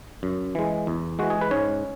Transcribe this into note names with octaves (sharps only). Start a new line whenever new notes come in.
F#2
E3 G#3
E2
E3 G#3 F#4
G#4
B4
G#2 C#4 C#5